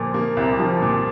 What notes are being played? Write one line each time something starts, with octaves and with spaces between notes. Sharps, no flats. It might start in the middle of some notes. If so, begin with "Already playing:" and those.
Already playing: A#2 F3
A#3
C2
F3
A#2